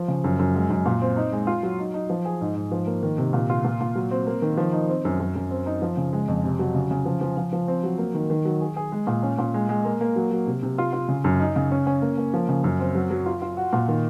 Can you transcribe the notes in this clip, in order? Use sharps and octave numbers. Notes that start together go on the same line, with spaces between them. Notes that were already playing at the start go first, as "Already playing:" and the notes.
Already playing: F3
C#3
F#2
F#2
G#3
F#2
A#2
C4
D#4
G#3
F4
F#3
D#4
D#4
F3
G#4
G#2
G#2
F3
A#3
D#3
C3
A#2
F4
A#2
A#2
F#3
C4
A#3
D#3
F3
D#4
C4
F#2
F#2
F#2
C4
D#4
F3
C#3
G#3
F2
C3
F#3
C#3
C#3
F3
F3
F3
F3
C4
F#3
A#3
D#3
D#3
F#3
G#4
G#4
G#3
A#2
C#4
A#2
G#3
G#3
A#3
A#3
F#3
F#3
C3
C3
F4
F4
C#3
F#2
D#4
C#3
C#4
C#4
A#3
A#3
F3
C#3
F#2
C4
F#3
F#3
F4
F4
F#4
A#2
D#3